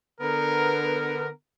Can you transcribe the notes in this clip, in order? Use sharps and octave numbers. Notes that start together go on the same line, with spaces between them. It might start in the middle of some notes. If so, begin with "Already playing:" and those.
D3 B3 A#4